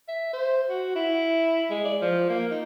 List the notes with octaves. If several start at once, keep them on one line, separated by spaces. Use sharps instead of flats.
E5
C5
F#4
E4
G#3
D5
F3
A#3
D#4